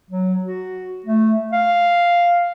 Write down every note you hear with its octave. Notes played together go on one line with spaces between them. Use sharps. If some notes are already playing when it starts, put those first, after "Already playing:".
F#3
F#4
A3
F5